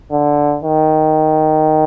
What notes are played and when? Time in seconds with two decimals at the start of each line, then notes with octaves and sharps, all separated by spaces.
0.12 D3
0.62 D#3